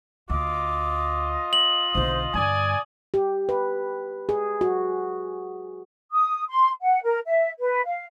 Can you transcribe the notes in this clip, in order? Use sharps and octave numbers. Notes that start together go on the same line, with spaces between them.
D2 F4 D#5 D6
F#7
B1 D3 C5
G2 D3 D5 G#5 D#6
G4
B4
G#4
F#4
D#6
C6
F#5
A#4
E5
B4
F5